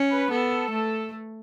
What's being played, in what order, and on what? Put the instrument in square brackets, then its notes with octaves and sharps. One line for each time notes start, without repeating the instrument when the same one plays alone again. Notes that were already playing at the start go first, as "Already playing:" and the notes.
Already playing: [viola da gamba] C#4
[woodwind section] B4
[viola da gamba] B3 [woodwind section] A4
[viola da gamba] A3